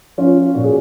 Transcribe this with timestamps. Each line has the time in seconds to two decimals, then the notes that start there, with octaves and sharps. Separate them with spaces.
0.18 F3 C#4 F4
0.55 A#2 F#4
0.64 G#4